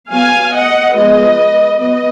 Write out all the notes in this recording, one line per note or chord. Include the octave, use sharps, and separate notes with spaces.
F#3 B3 F5 G#5
D#5 F#5
F3 G#3 B3 B4 D#5
F#3 B3 B4 D#5